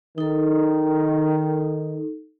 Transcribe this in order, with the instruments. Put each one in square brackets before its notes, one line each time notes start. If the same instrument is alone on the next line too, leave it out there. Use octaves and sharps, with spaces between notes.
[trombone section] D#3 [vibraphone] D#4 A4